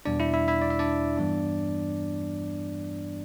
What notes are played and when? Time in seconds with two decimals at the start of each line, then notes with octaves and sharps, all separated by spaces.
0.05 E2 B2 G3 D4 D5
0.20 E4 E5
0.34 E4 E5
0.48 E4 E5
0.62 D5
0.70 E5
0.79 D4 D5
1.17 G2 E3 G3 B3 D4